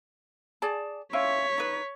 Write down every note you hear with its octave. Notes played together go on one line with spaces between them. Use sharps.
G#4 D5 A5
C#4 E4 F4 C#5 B6
D#4 B4